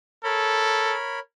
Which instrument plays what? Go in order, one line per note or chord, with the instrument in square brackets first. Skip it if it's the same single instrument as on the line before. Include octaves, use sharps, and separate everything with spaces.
[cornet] A4 [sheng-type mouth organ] A#4 C#5 B5